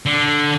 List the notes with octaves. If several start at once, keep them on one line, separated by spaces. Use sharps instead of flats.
D3